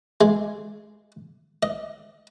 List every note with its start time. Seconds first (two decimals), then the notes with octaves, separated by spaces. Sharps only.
0.21 G#3
1.63 D#5